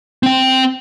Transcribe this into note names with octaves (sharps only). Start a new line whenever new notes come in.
C4 G5